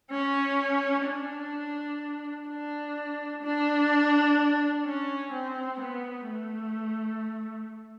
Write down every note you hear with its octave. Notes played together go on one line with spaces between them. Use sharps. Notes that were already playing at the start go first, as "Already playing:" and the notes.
C#4
D4
D4
D4
C#4
C4
B3
A3